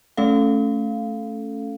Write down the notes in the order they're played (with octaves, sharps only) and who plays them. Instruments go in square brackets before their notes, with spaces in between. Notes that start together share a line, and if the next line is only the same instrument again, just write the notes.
[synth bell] A3 C#4 A4 F5